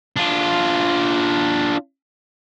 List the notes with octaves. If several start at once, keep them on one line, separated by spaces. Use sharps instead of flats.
D4 F4